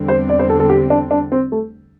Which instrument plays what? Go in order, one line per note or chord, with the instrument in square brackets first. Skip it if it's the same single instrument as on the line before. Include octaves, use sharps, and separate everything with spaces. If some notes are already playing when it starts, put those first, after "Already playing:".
Already playing: [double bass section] E2 D3 G3 C4
[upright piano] C5
D5
C5
A4
A4
G4
D4
D4
C4
A3